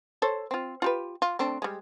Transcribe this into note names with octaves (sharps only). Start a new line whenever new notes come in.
A4 C5 C#5
C4 F4
F4 G4 B4
F4
A3 C4 D4
G3 G#3